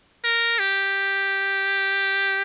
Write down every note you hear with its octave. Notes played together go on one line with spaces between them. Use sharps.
A#4
G4